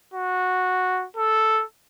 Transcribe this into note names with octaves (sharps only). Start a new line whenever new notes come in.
F#4
A4